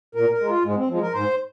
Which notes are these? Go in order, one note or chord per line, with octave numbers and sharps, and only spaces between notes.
A#2 A#4
A#4
G#3
F4
G#2 G#3
C4
F3 G#3
A#4
G#2 C5